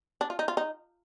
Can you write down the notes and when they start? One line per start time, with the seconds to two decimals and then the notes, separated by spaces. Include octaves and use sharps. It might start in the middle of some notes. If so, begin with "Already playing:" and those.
0.21 D4
0.30 F4
0.39 D#4
0.48 F4
0.57 D#4